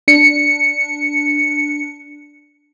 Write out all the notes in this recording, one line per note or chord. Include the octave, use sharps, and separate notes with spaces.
D4 C#7